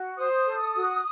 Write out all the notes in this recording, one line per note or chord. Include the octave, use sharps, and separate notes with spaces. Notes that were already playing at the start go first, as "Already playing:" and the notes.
Already playing: F#4
C5 D#6
A4
F#4